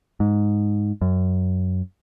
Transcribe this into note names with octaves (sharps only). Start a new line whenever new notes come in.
G#2
F#2